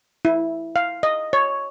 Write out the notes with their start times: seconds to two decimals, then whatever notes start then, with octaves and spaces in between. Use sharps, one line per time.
0.25 E4
0.76 F5
1.03 D#5
1.33 C#5